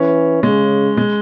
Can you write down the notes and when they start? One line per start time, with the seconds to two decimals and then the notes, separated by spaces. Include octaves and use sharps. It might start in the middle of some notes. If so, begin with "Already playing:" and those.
Already playing: E3 C#4
0.43 C#3 G#3
0.97 G#3